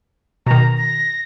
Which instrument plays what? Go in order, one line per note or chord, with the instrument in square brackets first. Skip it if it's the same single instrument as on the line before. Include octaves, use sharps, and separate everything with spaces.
[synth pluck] B2 D#3 [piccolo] A#5
[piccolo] A#6